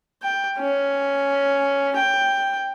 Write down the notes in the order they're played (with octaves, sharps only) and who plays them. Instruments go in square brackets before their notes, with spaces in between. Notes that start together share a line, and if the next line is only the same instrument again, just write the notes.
[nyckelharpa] G5
C#4
G5